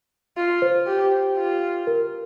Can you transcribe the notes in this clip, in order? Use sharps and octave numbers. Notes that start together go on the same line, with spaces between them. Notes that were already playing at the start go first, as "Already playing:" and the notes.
F4
C5
G4
F4
A#4